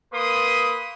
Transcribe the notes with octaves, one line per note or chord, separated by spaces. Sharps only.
A#3 B4 C6 D#6